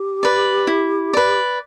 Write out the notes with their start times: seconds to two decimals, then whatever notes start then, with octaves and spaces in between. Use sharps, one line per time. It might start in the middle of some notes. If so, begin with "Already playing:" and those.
Already playing: G4
0.23 B4 D5
0.67 E4
1.13 B4 D5